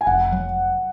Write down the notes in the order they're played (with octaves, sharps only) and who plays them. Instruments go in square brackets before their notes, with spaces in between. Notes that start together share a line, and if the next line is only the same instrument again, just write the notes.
[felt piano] G#5
[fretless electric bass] F1 [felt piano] F#5
[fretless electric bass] F#3